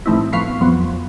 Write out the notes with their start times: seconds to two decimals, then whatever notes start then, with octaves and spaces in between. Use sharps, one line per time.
0.06 A2 E3 A3 C4 D#4 E4
0.33 F3 B3 F5 C#6 B6 C7
0.61 F2 F3 F#3 B3